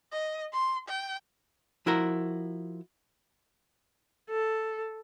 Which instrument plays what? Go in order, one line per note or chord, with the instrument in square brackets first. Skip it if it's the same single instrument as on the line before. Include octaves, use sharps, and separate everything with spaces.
[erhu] D#5
C6
G5
[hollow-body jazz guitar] F3 E4 F#4 A#4
[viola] A4